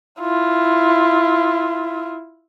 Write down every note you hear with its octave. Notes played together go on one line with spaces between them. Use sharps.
E4 F4